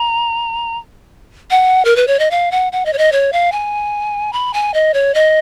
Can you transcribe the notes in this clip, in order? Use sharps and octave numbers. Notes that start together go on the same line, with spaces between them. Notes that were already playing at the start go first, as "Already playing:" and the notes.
Already playing: A#5
F#5
A#4
B4
C#5
D#5
F5
F#5
F#5
D#5
C#5
D#5
C#5
F5
G#5
B5
G#5
D#5
C#5
D#5